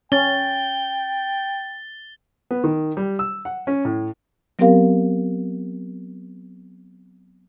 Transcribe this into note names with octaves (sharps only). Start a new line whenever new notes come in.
C#4 G5 A6 G7
B3
D#3
G3
E6
F#5
C#4
A2
F#3 B3 C4 G4 A#4 F5